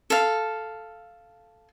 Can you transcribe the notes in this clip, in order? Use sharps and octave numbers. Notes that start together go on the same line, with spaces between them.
A4 F5